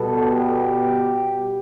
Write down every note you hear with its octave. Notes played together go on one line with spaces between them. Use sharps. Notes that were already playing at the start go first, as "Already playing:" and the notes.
Already playing: B2 G3 B3 A4
G4